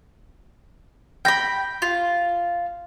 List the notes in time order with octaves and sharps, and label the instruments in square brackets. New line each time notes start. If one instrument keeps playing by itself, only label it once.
[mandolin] G5 B5 [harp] G6 A#6
[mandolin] F4